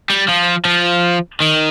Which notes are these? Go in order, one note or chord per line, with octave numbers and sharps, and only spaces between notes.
G3
F3
F3
D#3